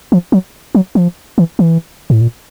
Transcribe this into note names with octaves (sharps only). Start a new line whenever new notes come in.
F3
F#3
F#3
F3
E3
E3
A2
A#2